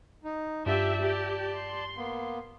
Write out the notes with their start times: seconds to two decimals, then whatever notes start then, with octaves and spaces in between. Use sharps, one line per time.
0.24 D#4
0.66 G2 F4 G4 D5 E5 A5
1.02 G4
1.55 C6
1.97 A#3 B3